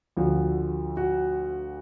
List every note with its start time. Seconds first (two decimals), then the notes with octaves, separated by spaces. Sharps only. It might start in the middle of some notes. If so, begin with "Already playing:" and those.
0.17 D2 D3 F3 F#4
0.97 F#4